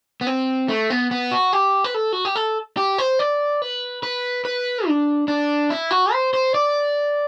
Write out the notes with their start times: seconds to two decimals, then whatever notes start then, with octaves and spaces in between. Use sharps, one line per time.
0.21 B3
0.27 C4
0.68 A3
0.90 B3
1.11 B3
1.31 F#4
1.53 G4
1.84 B4
1.94 A4
2.13 F#4
2.25 G4
2.35 A4
2.77 G4
2.98 C5
3.19 D5
3.62 B4
4.03 B4
4.45 B4
4.87 D4
5.28 D4
5.70 E4
5.91 F#4
6.12 C5
6.34 C5
6.55 D5